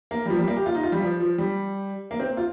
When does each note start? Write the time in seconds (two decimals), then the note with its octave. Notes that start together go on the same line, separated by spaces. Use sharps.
0.11 A#3
0.26 G3
0.30 F3
0.39 G3
0.48 A#3
0.57 G4
0.66 F4
0.75 D#4
0.83 F4
0.92 G3
1.02 F3
1.20 F3
1.38 G3
2.11 A#3
2.20 C4
2.37 F4